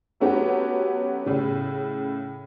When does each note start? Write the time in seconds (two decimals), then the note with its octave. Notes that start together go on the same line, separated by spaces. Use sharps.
0.20 F#3 A3 B3 C#4 F#4 G4
1.26 A2 C#3